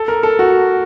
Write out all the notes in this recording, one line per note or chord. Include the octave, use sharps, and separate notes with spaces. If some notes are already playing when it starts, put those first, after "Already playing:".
Already playing: A4
A#4
A4
F#4